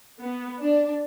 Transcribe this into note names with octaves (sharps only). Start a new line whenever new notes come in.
B3
D4